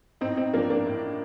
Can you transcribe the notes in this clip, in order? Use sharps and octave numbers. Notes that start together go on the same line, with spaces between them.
A2 C4 D#4
C4 D#4
F3 A#3 D4
A#3 D4
A2